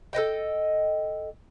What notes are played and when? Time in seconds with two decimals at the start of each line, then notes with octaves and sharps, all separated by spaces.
0.13 A4 B4 D#5 G5